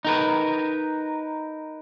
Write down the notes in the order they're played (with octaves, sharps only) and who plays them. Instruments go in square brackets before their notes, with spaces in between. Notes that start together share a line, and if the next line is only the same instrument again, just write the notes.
[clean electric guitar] D#4 A#4 B4